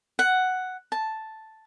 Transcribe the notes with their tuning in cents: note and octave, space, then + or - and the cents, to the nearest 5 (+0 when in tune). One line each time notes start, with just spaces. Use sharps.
F#5 +5
A5 +0